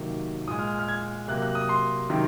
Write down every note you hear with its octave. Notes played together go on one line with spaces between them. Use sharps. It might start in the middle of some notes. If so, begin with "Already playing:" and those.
Already playing: C3 D#3 F#3 A#3
A#2 G#3 D#6
F6
F6
G#6
C3 F#3 A#3 F#6
F#6
D#6
C6
C3 D#3 F#3